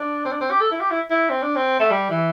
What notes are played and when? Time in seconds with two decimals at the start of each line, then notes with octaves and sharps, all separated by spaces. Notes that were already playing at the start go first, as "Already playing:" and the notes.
Already playing: D4
0.25 C4
0.32 D4
0.41 C4
0.51 G4
0.61 A4
0.72 E4
0.80 G4
0.91 E4
1.10 E4
1.30 C4
1.43 D4
1.56 C4
1.80 A3
1.90 G3
2.10 E3